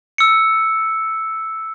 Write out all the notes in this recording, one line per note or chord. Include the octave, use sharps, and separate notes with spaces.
E6 C#7